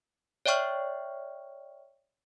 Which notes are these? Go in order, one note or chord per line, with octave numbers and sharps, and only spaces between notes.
C#5 D5 E5 G5 C#6 F6